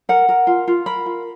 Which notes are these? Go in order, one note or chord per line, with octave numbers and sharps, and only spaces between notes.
A#4 F#5
A#4
F4
F4
A#4 B5
F4